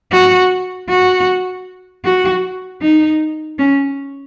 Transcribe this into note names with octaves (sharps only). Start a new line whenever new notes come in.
F#4
F#4
F#4
D#4
C#4